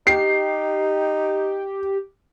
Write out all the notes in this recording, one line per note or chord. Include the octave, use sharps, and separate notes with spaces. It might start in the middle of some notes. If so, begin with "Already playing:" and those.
D#4 G4 C7